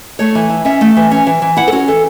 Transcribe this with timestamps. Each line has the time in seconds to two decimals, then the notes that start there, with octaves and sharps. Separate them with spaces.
0.19 A3 C#5
0.35 E3
0.50 E4
0.65 C#4 E5
0.81 A3
0.96 E3
1.11 C#4
1.27 E3
1.42 E3
1.57 E4 F#5
1.67 A4
1.72 C#4 F#4
1.88 E3 A4